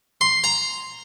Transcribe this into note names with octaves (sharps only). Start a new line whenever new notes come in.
C6
A#5